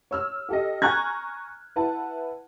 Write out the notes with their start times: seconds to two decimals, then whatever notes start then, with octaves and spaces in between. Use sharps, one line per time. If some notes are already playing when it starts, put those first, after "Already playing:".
0.11 C#5 E6 F6
0.49 G4 A4 D#5
0.82 G#5 A#5 C#6 F6 F#6 G#6
1.76 E4 B4 F#5 A5